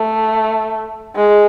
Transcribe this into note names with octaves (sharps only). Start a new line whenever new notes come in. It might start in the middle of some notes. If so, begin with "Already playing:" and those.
Already playing: A3
G#3